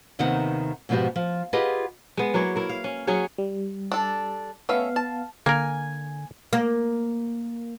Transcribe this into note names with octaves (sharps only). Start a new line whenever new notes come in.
D#2 C3 D#3 B3 D#4 F#5
G#2 B2 F3 B3 F#4 G4
F3
F4 G4 G#4 B4 D#5 F#5
G#3 B3
F#3 A#3 E4 C#5
E4 A#4
F5
C#4
F#3 C#4 G#4 C#5
G3
D4 A4
A3 B3 C#4 E5 F5
A5
D3 A#3 A#4 G#5
A#3